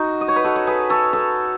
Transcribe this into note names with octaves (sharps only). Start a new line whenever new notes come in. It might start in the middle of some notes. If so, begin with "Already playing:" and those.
Already playing: D#4 F#4
D#5
C#5
B4
F#4 A4
C#5
G#4 B4
A4 C#5
A4 C#5